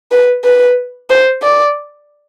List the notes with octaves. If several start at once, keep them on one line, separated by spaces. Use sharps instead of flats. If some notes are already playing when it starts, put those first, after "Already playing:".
B4
B4
C5
D5